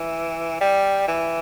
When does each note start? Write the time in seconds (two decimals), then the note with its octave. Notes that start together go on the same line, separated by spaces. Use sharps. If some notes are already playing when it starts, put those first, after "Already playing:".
Already playing: E3
0.61 G3
1.08 E3